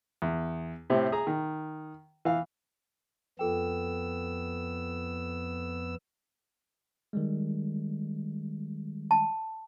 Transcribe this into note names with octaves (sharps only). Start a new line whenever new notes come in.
E2
A2 C3 C4
G#4 A#5
D#3
E3 F5
F2 B3 F4 A4 G5 E6
D#3 G3 G#3
A5